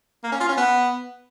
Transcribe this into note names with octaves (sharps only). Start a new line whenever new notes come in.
A#3
C#4
F4
C#4
B3